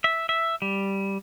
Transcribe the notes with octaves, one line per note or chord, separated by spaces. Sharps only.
E5
E5
G3